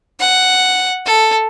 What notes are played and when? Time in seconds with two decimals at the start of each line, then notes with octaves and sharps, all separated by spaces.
0.20 F#5
1.06 A4